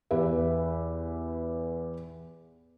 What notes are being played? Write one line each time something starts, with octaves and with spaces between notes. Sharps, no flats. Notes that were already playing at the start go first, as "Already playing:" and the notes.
E2 G4 B4 E5